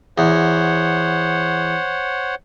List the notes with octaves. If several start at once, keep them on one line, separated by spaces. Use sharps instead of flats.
E2 C5 C#5 F#5